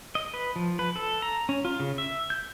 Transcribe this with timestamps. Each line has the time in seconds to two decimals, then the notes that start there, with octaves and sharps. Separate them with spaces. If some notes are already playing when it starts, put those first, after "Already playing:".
0.15 D#5
0.34 B4
0.56 F3
0.79 B4
0.96 A4
1.22 A#5
1.49 C#4
1.65 F4
1.80 C#3
1.98 E5
2.30 G6